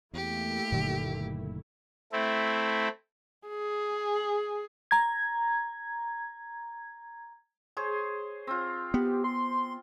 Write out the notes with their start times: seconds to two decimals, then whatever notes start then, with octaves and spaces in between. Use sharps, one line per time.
0.14 E2 A3 A#3 E4 G4
0.72 F#1 A#2 D3 D#3 F#3
2.12 A3 C4 E4
3.48 G#4
4.91 A#5 G#6
7.77 G#4 C5 C#5
8.47 C4 F4
8.94 B3 G4
9.24 C6